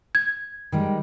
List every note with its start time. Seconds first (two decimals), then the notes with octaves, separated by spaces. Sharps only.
0.15 G#6
0.72 D#3 G3 G#3